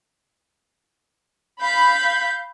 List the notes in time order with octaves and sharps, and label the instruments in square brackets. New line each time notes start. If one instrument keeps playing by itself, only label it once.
[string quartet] F5 G6 [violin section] B5